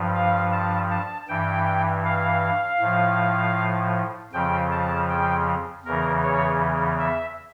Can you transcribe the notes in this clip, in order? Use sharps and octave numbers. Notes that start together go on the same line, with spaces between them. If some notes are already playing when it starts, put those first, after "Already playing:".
Already playing: G2 F3
F5
A5
A5
G2 E3 G5
F5
A2 F3
F2 C#3 F3 G5
A5
G5
E2 C#3 E3 A#4
C#5
E5